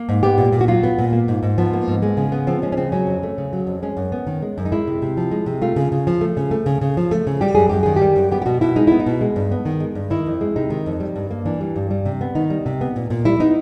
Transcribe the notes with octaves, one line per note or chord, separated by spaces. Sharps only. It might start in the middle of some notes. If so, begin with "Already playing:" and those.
Already playing: A#3
G#2
B3 G4
A#2
A#2
F#4
F#3 F4
B3
A#2
A#3
G#2
G#2
F3 B3
A#3
G#2
G#3
C#3
B3
F3 C4
G#3 C#4
C#4
C#3 C4
F#3 C#4
F2
A3
C#3
F#3
F2
G#3 C#4
F#2
B3
D#3
G#3
F#2
D#4
G#3 E4
C3
C3
F3
G#3
C3
A3 F4
C#3
C#3
F3
A3
C#3
A3
C#3
C#3
F3
A3
C#3
G3 G4
F#2 G#4
F#2 G4
D#3 G#4
G3 G4
F#2
B3 G4
G4
B2 F#4
B2 E4
G#3 D#4
B3 E4
D#4
B2
G#3
G2
B3
D#3
G#3
G2
D#3 E4
F2
G#3
C3 D#4
D#3
F2
G3
G2
A#3
E3 D4
G3
G2
G3
C3
B3
D#3 D#4
G3
C3
B3
A#2
A#2
G3 E4
B3 D#4